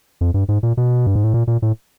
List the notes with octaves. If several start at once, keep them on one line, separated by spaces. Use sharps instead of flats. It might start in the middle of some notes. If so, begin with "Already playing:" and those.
F2
G2
G#2
A#2
B2
G2
G#2
A2
A#2
A#2
A2